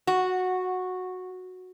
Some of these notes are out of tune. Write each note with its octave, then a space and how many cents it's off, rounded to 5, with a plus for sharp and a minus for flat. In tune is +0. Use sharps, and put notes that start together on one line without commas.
F#4 -10